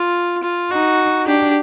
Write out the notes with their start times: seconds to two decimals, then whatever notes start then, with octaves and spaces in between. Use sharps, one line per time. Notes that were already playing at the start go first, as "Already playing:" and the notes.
Already playing: F4
0.43 F4
0.70 D#4 F#4
1.27 D4 G4